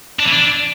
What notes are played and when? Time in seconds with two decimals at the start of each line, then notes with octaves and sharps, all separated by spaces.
0.20 D4
0.26 E3
0.32 D4